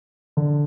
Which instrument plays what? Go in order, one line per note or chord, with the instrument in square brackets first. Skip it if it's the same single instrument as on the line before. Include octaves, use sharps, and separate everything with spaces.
[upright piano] D3